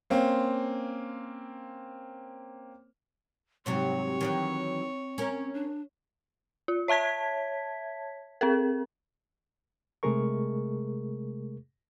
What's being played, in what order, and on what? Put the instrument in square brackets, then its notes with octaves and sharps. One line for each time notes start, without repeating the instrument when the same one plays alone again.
[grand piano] A#3 C4 C#4
[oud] G#2 C3 F#3 [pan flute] C4 [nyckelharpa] C#5
[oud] D#3 E3 F#3
C#4 A#4
[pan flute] D4
[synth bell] F4
C#5 E5 A5 G#6 B6
C4 G#4 A#4
[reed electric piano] C3 G#3 A3 G#4 A#4 C#6